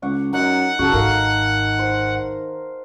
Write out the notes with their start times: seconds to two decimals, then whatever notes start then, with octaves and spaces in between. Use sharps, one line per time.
0.02 C#2 F#5 C#6 D6
0.33 F#2 D#4 F#5
0.79 F#2 C#3 F#4 A4
0.93 G#1 G#2 D#3 A#4 F5
1.79 C5